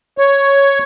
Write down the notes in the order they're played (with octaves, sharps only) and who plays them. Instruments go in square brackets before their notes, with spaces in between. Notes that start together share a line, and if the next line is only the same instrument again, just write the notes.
[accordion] C#5